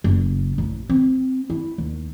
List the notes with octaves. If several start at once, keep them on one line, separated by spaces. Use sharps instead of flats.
F#1
A1
C4
E4
D#2